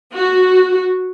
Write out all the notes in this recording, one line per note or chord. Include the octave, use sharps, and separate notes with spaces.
F#4